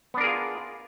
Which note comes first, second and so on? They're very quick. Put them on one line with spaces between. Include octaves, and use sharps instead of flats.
B3 D4 A#4 G#4 F4